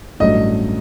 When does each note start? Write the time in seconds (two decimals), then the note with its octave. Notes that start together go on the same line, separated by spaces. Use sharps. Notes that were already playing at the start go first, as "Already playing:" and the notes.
0.20 A1 G2 F#3 A3 D4 D#5